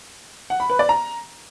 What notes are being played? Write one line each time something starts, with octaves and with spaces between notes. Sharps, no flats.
F#5
B5
B4
D5
A#5